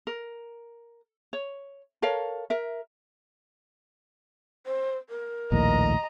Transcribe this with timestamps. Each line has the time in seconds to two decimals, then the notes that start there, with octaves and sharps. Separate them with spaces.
0.07 A#4
1.33 C#5
2.02 A4 A#4 C#5 F5
2.50 A#4 E5
4.66 C5
5.09 A#4
5.52 A#1 D#2 A2 D#5 A#5